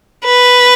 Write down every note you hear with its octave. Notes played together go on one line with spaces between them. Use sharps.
B4